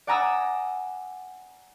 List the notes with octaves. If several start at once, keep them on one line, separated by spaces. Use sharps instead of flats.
D5 F#5 G#5 A#5 D#6 E6